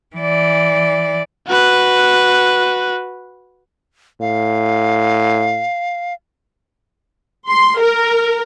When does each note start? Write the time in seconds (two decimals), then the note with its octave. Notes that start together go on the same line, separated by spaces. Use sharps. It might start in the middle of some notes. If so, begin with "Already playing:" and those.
0.16 E3 D5
1.47 F#4 B4
4.21 A2 F5
7.49 C6
7.80 A#4